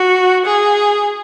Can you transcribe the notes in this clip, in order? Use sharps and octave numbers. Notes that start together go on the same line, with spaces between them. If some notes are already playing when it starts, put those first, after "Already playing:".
Already playing: F#4
G#4